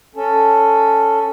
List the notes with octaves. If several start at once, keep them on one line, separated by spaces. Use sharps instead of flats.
C#4 A4